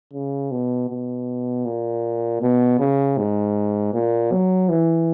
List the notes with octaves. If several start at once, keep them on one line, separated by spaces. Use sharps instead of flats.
C#3
B2
B2
A#2
B2
C#3
G#2
A#2
F#3
E3